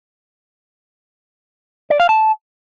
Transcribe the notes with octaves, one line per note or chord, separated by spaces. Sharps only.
D5
F5
A5